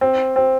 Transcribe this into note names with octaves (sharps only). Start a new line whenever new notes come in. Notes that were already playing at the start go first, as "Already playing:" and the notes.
C4
C4